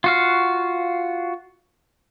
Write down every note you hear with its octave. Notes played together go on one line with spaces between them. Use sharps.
F4 F#4 F5